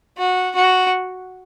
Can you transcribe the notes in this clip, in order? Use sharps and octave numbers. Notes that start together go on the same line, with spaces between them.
F#4
F#4